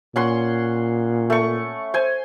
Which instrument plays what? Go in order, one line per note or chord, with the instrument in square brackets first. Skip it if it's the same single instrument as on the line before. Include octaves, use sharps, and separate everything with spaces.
[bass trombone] A#2 [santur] C#4 F#5 C6
[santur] A3 C#6
C5 G#5